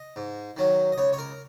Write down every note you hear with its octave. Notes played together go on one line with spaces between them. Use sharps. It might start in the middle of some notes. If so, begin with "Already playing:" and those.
Already playing: D#5
G#2
D#3 F#3 C#4
D#5
C#2 C#5
C#5
A#4